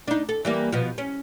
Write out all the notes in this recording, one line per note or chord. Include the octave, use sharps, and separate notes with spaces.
D4 D#4
A4
E3 G3 A#3
B2 F3
C#4